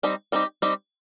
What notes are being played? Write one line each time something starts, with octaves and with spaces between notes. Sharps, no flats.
G3 C4 D#4 G4
G3 C4 D#4 G4
G3 C4 D#4 G4